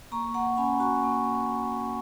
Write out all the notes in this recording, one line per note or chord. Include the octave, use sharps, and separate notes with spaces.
A#3 A#5 C#6
A#3 F#5 A#5
C#4 G#5 B5
F#4 A#5 C#6
A#3